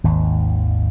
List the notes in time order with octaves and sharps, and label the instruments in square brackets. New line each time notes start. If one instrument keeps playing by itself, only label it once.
[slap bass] G#1 D#2